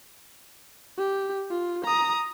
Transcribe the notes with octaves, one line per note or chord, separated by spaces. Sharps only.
G4
F4
A#5 D#6